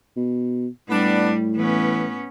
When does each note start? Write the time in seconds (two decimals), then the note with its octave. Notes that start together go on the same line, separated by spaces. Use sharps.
0.17 B2
0.89 A2 G3 B3 D4
1.56 E3 B3 C#4